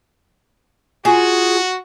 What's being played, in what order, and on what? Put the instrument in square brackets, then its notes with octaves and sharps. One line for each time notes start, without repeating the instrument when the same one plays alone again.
[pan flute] F4 [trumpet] F#4 [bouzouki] G#4